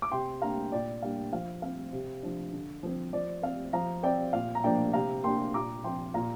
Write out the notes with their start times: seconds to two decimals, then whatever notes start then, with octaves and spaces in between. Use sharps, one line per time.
0.02 D6
0.11 C3 G5 C6
0.42 A#3 D4 F5 A#5
0.72 A#2 D5 G5
1.02 G3 A#3 D4 F5
1.32 F3 F5
1.62 C4 F5
1.92 C3
2.23 F3 D4
2.53 D3
2.83 F3 C4
3.13 F3 D5
3.43 C4 F5
3.73 F3 F5 A#5
4.03 C4 D5 G5
4.33 A#2 F5
4.55 A#5
4.64 F3 A#3 D4 D5 G5
4.93 C3 F5 A#5
5.24 A#3 D4 G5 C6
5.54 A#2 A#5 D6
5.84 F3 C4 G5 C6
6.14 A#2 F5 A#5